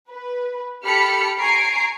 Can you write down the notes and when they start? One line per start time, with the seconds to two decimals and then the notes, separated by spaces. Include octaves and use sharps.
0.10 B4
0.84 G4 A4 B5 F6 B6 C#7
1.40 G#5 A#5 C#6 C7 D7